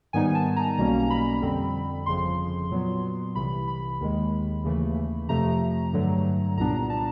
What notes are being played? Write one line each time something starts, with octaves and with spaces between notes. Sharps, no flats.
G#2 D#3 G3 B3 D#4 G#5
A5
A#5
B1 B2 G3 A#3 C#4 A#5
A#5
B5
F2 D3 G3 C4
G1 F2 C#3 F3 C6
A#2 F#3 B3
C2 C3 E3 B5
B5
D#2 D#3 G#3
D#2 C#3 E3 A3
F2 C3 F3 A3 A#5
G2 D3 F#3 A3
C2 A#2 G3 B3 D4 A#5
A5